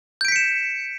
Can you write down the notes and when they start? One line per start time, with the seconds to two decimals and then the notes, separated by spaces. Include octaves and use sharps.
0.21 G6
0.25 D7
0.28 B6
0.32 C#7
0.36 E7